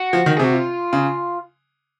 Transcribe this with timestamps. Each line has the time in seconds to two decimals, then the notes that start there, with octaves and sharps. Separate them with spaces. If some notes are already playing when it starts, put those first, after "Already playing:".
Already playing: F#4
0.13 F3
0.26 D#3
0.37 G#4
0.39 C3 F#4
0.53 F4
0.93 C#3